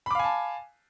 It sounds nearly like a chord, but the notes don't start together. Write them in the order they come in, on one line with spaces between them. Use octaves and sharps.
B5 D6 F5 G#5 A5